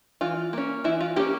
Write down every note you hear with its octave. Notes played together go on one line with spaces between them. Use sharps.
E3 F4
A#3 C#4
E3 E4
F4
A#3 C#4 E4 G4